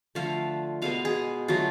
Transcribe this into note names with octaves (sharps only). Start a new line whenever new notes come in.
D3 F3 A3 F5
B2 G#3 B3 F5
G#4
D3 F#3 A3 F4